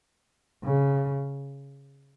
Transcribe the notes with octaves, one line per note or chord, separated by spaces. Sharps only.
C#3